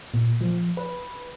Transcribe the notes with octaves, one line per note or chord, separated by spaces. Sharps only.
A#2
F3
B4